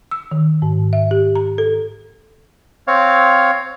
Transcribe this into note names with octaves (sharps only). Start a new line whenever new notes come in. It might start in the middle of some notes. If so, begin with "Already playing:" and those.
E6
D#3
G#2
E5
G4
A#5
A4
C4 C#5 F5